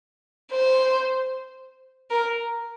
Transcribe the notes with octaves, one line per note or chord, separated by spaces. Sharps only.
C5
A#4